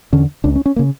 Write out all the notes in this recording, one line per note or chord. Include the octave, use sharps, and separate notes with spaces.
E2 D3 C#4
C#2 C#3 D4
C#4
C#4
A#3
C#3